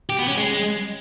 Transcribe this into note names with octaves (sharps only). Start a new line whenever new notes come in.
G4
B3
C#4
G#3